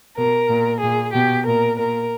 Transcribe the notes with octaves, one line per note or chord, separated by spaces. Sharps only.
B2 A#4
A#2
A#2 G#4
B2 G4
A#2 A#4
A#2 A#4